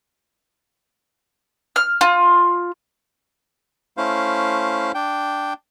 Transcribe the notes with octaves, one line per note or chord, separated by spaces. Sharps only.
F6
F4
A3 C#4 E4 C5 F5
D4 G5